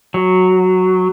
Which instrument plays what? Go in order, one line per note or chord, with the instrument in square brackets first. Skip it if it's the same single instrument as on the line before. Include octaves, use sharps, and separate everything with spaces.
[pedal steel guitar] F#3